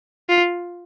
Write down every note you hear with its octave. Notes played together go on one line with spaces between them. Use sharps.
F4